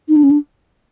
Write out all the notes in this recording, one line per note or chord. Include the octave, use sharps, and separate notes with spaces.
D#4
D4
C#4
D4